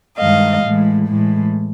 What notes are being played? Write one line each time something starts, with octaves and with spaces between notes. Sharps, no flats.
G2 D#3 G#3 D#5 F5
A2 E3 G#3
A2 E3 G#3